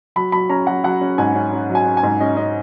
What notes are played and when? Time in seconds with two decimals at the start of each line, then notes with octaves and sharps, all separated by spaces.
0.16 F#3 B5
0.32 F#3 B5
0.49 C#4 A#5
0.67 F#3 F#5
0.84 F#3 F#5
1.01 C#4
1.18 G#2 G#5
1.35 C#4
1.52 C#4
1.69 F#3
1.75 G#5
1.86 C#4
1.97 G#5
2.03 G#2
2.20 C#4 D#5
2.37 C#4 D#5